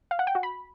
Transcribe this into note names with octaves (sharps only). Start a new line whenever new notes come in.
F5
F#5
G5
F#4
B5